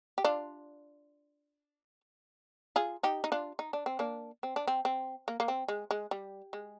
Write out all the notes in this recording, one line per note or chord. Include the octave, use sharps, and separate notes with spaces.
G4
D4 F4
F4 G#4
D#4 G4
D#4
D4 F4
D#4
D4
C4
A#3 D4
C4
D4
C4
C4
A#3
A#3
C4
G#3
G#3
G3
G#3